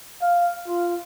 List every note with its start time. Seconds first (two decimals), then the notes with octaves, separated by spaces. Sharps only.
0.22 F5
0.67 F4